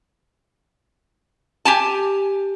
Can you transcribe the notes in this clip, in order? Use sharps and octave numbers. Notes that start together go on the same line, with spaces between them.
G4 G#5 A5